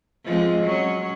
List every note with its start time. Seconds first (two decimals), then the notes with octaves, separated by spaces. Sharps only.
0.24 F3 G#3 C4
0.63 F#3 C#4